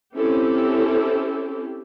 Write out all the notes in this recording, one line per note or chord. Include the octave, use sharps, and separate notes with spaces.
C4 C#4 E4 G4 A4